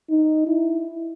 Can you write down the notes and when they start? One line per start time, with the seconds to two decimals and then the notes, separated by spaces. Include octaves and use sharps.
0.10 D#4
0.47 E4